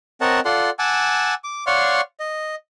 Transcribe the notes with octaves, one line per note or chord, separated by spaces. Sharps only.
C4 A#4 C#5 D#5 F#5 A5
F4 A4 D5 F#5 C6
F#5 G#5 A5 D6 E6
D6
C#5 D5 F5 F#5 C6 C#6
D#5